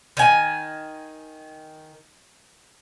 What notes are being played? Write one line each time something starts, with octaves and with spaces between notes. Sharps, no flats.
D#3 G#5